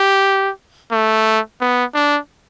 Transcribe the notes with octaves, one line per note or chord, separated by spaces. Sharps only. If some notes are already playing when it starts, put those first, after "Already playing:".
Already playing: G4
A3
B3
D4